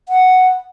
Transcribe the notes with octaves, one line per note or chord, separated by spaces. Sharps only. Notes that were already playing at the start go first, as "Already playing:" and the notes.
F#5